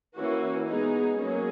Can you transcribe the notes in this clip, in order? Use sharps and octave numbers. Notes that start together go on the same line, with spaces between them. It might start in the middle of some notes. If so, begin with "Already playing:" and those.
E3 A#3 C#4 F#4
G#3 B3 D#4 G#4
F#3 A#3 C#4 G#4